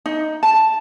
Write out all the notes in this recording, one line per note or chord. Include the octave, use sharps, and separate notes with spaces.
D#4
A5